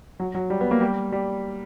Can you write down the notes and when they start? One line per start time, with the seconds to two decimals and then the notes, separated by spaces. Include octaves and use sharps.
0.20 F#3
0.35 F#3
0.50 G3
0.61 B3
0.71 A#3
0.81 G3
1.12 G3